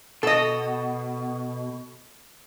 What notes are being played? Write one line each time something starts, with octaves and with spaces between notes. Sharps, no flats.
B2 A4 D#5